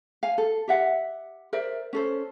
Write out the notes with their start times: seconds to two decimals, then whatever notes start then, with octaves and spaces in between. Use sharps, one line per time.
0.23 F5 G#5
0.38 A4
0.68 G4 E5 F#5
1.53 A#4 C5 D5 E5
1.93 C#4 A4 C5